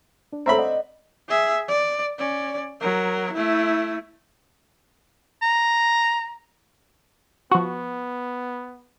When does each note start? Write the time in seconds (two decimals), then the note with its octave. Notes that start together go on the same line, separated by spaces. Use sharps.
0.32 D4
0.46 C4 A4 C#5 E5 A#5 B5
0.58 D5 D#5 F#5
1.29 G#4 E5
1.68 D5
2.18 C#4 D5
2.80 F#3 A#4
3.33 A3 E4
5.42 A#5
7.51 F3 B3 F#4